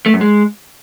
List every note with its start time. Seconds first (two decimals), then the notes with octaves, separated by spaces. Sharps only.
0.06 A3
0.13 F#2
0.21 G#3